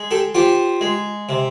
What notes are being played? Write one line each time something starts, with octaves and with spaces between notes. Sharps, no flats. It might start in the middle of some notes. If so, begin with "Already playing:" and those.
Already playing: G#3
G4 A4
F3 F4 G4
G#3
C3